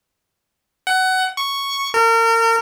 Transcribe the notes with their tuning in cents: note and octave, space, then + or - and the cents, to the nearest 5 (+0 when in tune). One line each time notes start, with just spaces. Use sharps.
F#5 +20
C#6 +0
A#4 -35